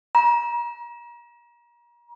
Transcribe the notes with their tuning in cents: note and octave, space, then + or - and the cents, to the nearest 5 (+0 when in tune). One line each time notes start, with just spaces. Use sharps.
A#5 +35